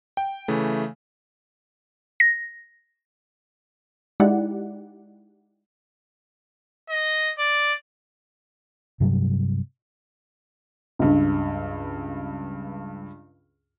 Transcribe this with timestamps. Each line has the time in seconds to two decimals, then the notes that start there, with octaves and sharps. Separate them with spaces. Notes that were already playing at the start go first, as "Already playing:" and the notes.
0.17 G5
0.48 C#3 E3 A3
2.20 A#6
4.20 G#3 D#4 E4 G4 D5 F#5
6.89 D#5
7.39 D5
9.00 G2 C3 F#3 G3
10.99 C#2 G2